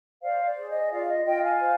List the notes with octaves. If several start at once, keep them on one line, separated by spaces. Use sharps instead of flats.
C5 D5 F5
D5
G#4
D#5
F4 D5 F5
D#5
F4 D#5 G5
F5 G#5
C5